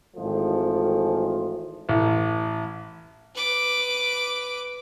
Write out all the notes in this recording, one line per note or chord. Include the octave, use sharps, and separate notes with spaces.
G#1 E3 F3 A3
A1
B4 D6